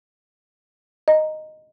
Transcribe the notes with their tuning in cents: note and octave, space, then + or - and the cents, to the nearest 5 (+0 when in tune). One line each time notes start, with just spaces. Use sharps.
D#5 -5 A#5 +0